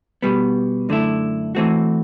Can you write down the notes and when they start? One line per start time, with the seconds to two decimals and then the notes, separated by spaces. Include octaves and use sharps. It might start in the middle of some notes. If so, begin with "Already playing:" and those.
0.22 B2 G3 B3
0.89 F#2 D3 A3 E4
1.55 E3 A3 C4 F#4